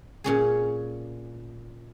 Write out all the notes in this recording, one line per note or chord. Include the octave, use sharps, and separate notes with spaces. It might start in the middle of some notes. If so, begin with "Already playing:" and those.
A#2 C#4 G#4